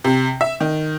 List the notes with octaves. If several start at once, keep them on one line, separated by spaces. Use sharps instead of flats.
C3
E5
D#3